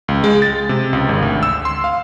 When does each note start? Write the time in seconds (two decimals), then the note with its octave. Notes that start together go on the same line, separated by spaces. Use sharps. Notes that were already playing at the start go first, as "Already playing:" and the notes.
0.08 C#2
0.24 G#3
0.42 A6
0.69 C3
0.93 C#2
1.09 G#1
1.22 D2
1.43 E6
1.65 C6
1.84 F5